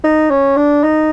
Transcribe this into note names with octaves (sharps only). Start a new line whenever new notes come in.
D#4
C#4
D4
D#4